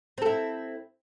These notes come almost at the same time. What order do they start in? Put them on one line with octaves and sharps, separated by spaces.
C4 A4 E4